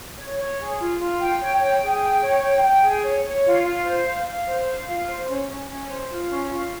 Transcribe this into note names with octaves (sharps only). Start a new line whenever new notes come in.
C#5
C#5
G#4
F4
F4
G5
C#5
G5
G#4
G5
C#5
G5
G5
G#4
C#5
C#5
F4
F4
C5
F5
F5
C5
F5
F4
C5
C#4
C#4
C#4
C5
F4
C#4
F4